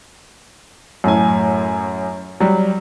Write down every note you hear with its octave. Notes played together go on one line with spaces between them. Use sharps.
F#2 A2 G#5
F#3 G3